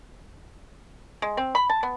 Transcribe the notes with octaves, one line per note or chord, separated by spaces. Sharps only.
G#3
C4
B5
A5
B3